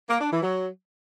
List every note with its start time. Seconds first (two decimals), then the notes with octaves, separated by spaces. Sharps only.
0.10 A#3
0.21 D4
0.32 E3
0.43 F#3